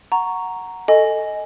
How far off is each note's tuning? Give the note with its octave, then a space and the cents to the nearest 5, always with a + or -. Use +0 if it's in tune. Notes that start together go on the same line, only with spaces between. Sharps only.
F#5 +0 A#5 +0 C#6 +5
A4 +10 D#5 +0 G#5 +0